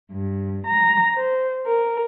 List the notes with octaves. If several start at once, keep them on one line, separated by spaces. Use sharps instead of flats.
G2
A#5
C5
A#4